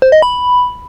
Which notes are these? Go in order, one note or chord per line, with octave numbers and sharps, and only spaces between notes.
C5
D#5
B5